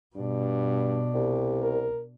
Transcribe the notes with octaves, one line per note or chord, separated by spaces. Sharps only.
G2 B2 D4
C2 G4
A#4